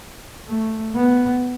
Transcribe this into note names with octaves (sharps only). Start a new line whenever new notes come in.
A3
B3